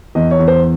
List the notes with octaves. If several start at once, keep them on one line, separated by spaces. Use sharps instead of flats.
E2 D#5
C#5
E2
C5